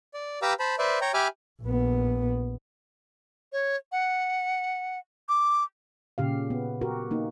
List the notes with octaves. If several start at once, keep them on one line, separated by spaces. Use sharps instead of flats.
D5
G4 B4 F5 A#5 D6 E6
C5 A5 B5
B4 C5 D5 E5
C#5 G5 A#5
G4 E5 G#5 B5 D6 F6
A#1 B3
C#5
F#5
D6
A#2 C#3 G4 F5
B3
F#4 G4 A#4
A#3 D#4